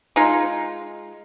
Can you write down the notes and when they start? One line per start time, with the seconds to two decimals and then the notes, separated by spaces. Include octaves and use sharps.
0.16 G#3 D#4 F4